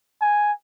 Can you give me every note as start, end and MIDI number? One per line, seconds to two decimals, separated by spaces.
0.22 0.52 80